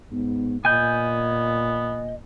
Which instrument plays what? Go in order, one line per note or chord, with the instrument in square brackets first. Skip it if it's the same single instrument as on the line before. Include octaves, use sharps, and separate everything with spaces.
[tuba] G#2 [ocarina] B3
[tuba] A#2 [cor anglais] B3 [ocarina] D#5 [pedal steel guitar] G#5 G6